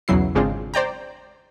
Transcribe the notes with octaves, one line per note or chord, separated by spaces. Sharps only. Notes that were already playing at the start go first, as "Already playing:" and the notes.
B1 E2 C#3 F#3 E4 C7
G#1 C#3 G#3 C4 D4 F4
C5 D5 G5 A#5